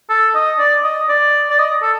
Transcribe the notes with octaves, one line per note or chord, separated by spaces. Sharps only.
A4
D#5
D5
D#5
D5
D5
D#5
A4